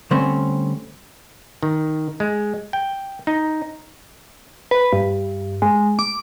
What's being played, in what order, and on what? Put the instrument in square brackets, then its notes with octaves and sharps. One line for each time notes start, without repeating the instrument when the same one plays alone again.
[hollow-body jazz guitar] D3 G3 A3 C4 C#4 C5
[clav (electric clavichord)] D#3
G#3
G5
D#4
[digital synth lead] B4
G2
G#3
D6